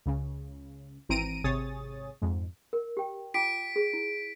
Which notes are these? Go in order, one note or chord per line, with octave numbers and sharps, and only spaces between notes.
C#2 C#3
G#1 E3 C4 A#5 D7 D#7
G#1 C3 G#4 C#5 D#6 A6
F2 G#2
A#4
G4 G5
F4 G5 D6 B6 D7
G#4
E4